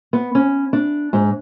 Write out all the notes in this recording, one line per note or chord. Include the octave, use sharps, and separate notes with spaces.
B3
C#4
D4
G#2